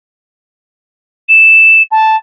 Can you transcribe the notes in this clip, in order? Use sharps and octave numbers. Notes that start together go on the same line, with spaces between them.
E7
A5